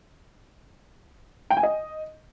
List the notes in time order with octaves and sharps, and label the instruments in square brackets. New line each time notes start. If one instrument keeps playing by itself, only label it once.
[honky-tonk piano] G5
G#5
D#5